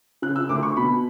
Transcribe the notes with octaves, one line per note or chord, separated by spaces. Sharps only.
C#3 F#6
E6
D2 D6
C#6
B2 B5